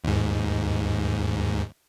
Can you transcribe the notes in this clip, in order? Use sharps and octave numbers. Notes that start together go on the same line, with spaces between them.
D#2 G#2